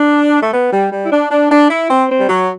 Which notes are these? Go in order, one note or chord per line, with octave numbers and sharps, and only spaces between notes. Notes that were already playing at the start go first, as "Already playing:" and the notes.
Already playing: D4
A3
B3
G3
G3
E4
D4
D4
D4
E4
C4
C4
G3
F#3